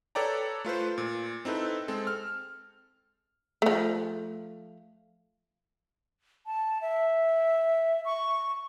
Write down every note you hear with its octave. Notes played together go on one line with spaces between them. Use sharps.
A4 B4 C#5 D5 G5 A#5
A3 F4 B4 C5
A#2
C4 D#4 E4 A4 B4
G#3 C4 A4
F6
F3 A3
A5
E5
C#6